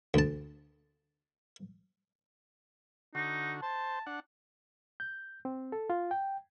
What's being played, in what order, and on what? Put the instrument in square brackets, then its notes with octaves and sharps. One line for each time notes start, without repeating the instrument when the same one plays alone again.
[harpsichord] D2 A5
[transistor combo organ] D3 F#4 [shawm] D#4
[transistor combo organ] C5 [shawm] A5
[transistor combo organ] D4 F#5
[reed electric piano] G6
C4
A4
F4
G5